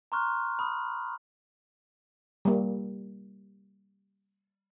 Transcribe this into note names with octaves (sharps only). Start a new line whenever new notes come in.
A#5 C6 C#6 F6 F#6
B5 D#6
G3 A#3